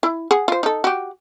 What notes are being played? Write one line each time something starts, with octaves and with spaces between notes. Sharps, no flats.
E4
G#4 F#5
F4 C5
D#4 A4
F#4 G4